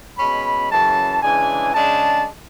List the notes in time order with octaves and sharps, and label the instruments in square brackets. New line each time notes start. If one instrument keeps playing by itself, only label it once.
[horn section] B2 G#3 C#4 B5
F#2 C#3 E3 A5
C#3 E3 G#3 D4 G#5
C#3 G#3 D4 A5